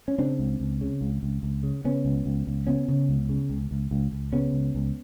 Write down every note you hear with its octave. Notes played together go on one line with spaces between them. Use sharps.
C#4
C#3 C4 D4
C#2
C#2
C#3
C#2
C#2
C#2
C#3
C#3 B3 C#4
C#2
C#2
C#2
C#3 B3 C#4
C#3
C#2
C#3
C#2
C#2
C#2
C#2
C#3 B3 C#4
C#2
C#2